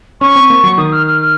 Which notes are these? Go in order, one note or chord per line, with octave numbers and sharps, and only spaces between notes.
C#4 C#6
C4
A#3
F#3
D#3 D#6
F6
F6
F6